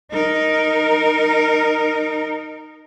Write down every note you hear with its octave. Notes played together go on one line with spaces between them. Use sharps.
D#4 A#4